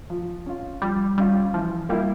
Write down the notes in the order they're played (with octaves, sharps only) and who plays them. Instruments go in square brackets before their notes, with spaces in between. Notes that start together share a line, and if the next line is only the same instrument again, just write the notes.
[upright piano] F3
C#4 F4
[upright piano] F3 [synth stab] G3
[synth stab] G3 [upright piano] C#4 F4
[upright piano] E3 [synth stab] F3
[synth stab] G3 [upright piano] A#3 E4